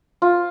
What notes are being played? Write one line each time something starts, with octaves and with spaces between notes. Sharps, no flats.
F4